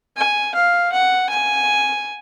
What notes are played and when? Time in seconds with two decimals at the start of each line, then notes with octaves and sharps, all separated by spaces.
0.17 G#5
0.55 F5
0.92 F#5
1.29 G#5